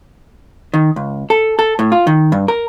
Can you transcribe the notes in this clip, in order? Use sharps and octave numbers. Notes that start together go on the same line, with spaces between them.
D#3
C#2
A4
A4
A2
F4
D#3
G2
A#4